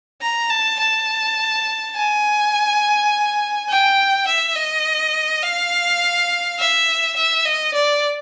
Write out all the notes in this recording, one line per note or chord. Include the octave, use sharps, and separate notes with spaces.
A#5
A5
A5
G#5
G5
E5
D#5
F5
E5
E5
D#5
D5